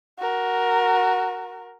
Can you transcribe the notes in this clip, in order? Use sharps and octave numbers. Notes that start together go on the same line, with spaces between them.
F#4 A#4